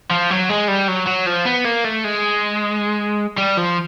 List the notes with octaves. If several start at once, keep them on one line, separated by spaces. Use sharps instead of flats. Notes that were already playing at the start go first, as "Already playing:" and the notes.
F3
F#3
G#3
G3
F#3
F#3
F3
B3
A#3
A3
G#3
G3
F3